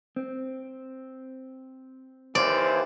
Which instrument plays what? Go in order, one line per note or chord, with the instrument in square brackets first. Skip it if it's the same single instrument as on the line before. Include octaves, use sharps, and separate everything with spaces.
[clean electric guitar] C4
[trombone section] D#2 E3 C5 [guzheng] D5